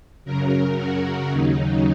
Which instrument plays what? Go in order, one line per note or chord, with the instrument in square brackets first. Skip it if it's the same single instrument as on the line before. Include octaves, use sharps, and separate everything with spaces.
[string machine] F#2 C#3 F#3 A#4
F#4
D#2 C#3 F#3 D#4